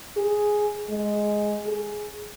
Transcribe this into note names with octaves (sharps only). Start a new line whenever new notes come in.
G#4
G#3
G#4